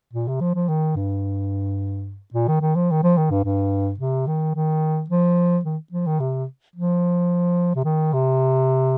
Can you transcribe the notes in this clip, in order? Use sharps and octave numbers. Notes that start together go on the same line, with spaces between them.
A#2
C3
F3
F3
D#3
G2
A#2
D#3
D#3
F3
D#3
F3
D#3
G2
G2
C3
D#3
D#3
F3
D#3
F3
D#3
C3
F3
C3
D#3
C3